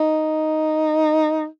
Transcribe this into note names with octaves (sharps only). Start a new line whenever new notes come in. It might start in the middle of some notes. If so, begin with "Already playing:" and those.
Already playing: D#4